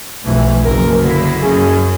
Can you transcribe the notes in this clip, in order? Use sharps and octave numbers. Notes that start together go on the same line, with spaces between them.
B1 F2 E3 A3
F#1 A#4
D3 F#3 A#3 E4
F#2 C#4 G#4